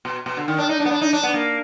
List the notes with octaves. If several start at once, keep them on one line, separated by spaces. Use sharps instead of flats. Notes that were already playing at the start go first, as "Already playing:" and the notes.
B2
B2
D3
D#3
D4
D#4
D4
B3
D4
D#4
D4
B3
A#3